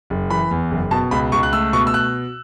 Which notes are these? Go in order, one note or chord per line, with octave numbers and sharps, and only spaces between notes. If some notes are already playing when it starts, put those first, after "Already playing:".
F#1
E3 B5
E2
F#1
B2 A5
C#2 B5
C#2 C#6
F#6
A3 E6
B2 C#6
E6
F#6